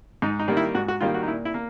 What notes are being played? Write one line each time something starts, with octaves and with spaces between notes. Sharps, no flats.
G#2 D#4
D#4
D#3 G3 A#3
E4
G#2 F#4
F#4
D#3 G3 A#3 F4
F#4
D#4
A#2 E4
E4
A#3